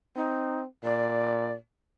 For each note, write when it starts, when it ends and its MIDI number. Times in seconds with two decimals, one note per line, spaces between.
0.16 0.66 60
0.16 0.59 63
0.84 1.55 46
0.84 1.52 74